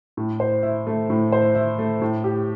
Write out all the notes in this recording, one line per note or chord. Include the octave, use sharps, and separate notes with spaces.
A2
C5
E4
A3
A2
C5
E4
A3
A2
G4